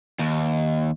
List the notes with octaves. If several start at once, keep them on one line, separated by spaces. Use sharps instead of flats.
D#2